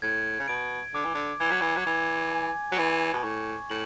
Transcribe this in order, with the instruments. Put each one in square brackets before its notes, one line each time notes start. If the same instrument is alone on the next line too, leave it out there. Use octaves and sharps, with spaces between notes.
[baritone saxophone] A2 [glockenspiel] G#6
[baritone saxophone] C#3
[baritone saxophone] B2 [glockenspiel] D7
[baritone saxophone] D3 [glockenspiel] D6
[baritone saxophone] E3
D3
[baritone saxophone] E3 [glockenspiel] G#6
[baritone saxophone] F#3
E3
F#3
[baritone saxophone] E3 [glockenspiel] G#6
[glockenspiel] G#5
[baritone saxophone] F#3
[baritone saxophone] E3 [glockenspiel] G#6
[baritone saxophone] B2
[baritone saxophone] A2 [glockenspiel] C#6
[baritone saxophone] A2 [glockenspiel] F#7